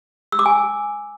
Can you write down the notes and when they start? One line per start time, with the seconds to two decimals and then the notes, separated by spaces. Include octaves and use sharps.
0.32 E6
0.39 D6
0.46 G#5